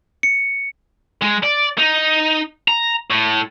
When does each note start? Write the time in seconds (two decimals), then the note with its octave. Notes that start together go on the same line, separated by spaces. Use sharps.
0.23 C#7
1.22 G#3
1.43 D5
1.78 D#4
2.68 A#5
3.10 A2